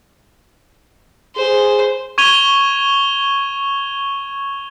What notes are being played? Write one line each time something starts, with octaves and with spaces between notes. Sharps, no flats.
G#4 C5
C#6 G#6 D#7 F7 G7